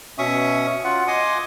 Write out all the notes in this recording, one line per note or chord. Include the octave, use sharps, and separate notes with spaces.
B2 C#4 E5 C#6 D#6
F4 F#5
D#5 G#5 C6 D6 D#6